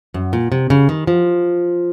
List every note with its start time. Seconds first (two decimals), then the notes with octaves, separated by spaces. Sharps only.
0.14 F#2
0.33 A#2
0.52 C3
0.70 C#3
0.89 D#3
1.07 F3